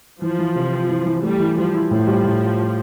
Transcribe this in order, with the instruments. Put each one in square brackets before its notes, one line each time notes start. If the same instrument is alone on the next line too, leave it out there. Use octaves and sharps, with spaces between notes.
[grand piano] E3 [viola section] F3
[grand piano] E3
C3
C4
E3
E3
[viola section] G3 [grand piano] A3
[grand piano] E3
[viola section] F3 [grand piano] G3
[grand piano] E4
[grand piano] A2 [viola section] F3
[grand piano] G3
A2